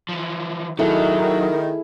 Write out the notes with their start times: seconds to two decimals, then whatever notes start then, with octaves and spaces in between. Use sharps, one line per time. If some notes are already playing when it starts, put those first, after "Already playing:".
0.09 E3 F3
0.79 D#3 F#3 E4 G#4 A4 B5